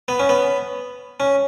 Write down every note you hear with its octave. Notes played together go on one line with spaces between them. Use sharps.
B3
C#4
B3
C#4